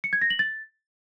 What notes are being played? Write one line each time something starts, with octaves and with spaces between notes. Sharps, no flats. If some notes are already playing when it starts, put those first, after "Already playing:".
C#7
G#6
A#6
F#7
A6